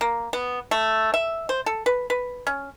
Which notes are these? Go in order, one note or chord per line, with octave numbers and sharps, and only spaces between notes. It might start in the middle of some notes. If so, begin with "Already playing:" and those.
A#3
B3
A3
E5
C5
A4
B4
B4
C#4